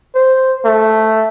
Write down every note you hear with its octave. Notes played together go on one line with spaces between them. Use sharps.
C5
A3